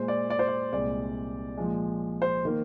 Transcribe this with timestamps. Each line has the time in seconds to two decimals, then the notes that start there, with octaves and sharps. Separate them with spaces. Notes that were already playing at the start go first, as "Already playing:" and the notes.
Already playing: A#2 G#3 C5
0.08 D5
0.30 D5
0.39 C5
0.48 D5
0.72 C2 A#2 G#3 D5
1.57 A#2 F3 G#3
2.22 C5
2.45 D#3 A#3